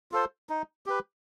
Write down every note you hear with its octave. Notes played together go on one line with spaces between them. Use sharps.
F4 A4 C5
D#4
G4 B4